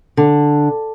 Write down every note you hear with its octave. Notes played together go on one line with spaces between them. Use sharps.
D3